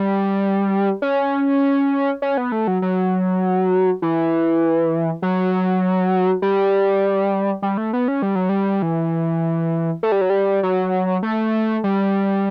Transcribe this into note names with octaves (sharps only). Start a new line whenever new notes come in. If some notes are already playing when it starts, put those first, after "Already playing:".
Already playing: G3
C#4
C#4
B3
A3
F#3
F#3
E3
F#3
G3
G3
A3
B3
C#4
G3
F#3
G3
E3
A3
G3
F#3
G3
F#3
A3
G3